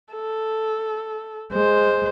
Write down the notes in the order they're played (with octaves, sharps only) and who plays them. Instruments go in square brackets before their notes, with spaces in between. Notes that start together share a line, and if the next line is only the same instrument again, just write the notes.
[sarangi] A4
[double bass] G#3 [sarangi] C5